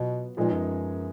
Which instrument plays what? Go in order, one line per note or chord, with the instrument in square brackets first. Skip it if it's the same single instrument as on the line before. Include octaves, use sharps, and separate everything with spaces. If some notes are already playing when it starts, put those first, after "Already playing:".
Already playing: [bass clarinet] B2 [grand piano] F#3 B3 F4
[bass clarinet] A#2 [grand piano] F3 G#3 B3 D#4 G#4
[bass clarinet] F#2